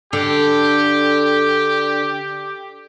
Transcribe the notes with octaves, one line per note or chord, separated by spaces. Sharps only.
D3 G4